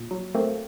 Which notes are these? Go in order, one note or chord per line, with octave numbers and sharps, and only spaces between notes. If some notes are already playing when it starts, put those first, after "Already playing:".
Already playing: A#2
F#3
A3 A#3 C4